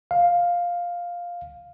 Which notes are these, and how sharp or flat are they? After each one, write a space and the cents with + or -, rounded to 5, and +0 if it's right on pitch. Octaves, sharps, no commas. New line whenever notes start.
F5 +5